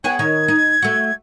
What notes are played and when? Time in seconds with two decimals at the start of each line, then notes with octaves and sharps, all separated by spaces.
0.04 B3 G#4 C#5 G5
0.19 D#3 C#5 G#6
0.48 D#4
0.82 A3 F#4